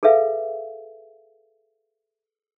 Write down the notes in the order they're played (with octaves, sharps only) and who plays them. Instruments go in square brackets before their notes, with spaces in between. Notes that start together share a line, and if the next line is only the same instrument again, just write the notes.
[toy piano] G#4 A4 B4 E5 F5